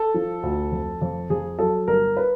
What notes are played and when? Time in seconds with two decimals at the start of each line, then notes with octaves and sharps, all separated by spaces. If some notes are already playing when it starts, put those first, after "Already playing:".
Already playing: A4
0.14 F3
0.43 D2
0.72 F2
1.02 F2
1.30 F2 G#4
1.59 F#3 A4
1.88 G1 A#4
2.17 B4